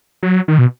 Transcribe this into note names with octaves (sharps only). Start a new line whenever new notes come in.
F#3
D#3
B2